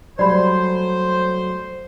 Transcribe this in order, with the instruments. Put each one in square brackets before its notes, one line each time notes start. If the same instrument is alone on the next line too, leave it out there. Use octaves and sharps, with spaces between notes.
[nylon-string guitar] F#3 G3 A3 [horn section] C5 [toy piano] D5 B5